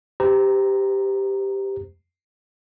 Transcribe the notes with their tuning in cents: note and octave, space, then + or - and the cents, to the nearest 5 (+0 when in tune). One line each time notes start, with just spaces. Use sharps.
G4 +0 C5 -35 A#5 +0